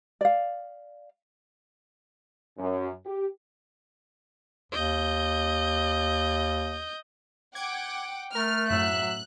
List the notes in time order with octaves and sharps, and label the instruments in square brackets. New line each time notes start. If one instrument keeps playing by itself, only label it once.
[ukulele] D5 F5
[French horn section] F#2
G4
[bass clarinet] D#2 [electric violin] D#5 G6
[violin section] F#5 G5 D6 [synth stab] G#6
[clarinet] A3 [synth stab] A#4 [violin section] F6
[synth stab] F#2 A2 [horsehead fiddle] F#3 E5 [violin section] F#6